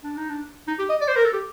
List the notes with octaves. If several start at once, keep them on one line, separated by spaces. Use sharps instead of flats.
D4
D#4
D4
D#4
G4
D#5
D5
C5
A#4
A4
G4